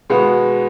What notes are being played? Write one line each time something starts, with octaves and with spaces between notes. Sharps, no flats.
B2 G#3 B3 F#4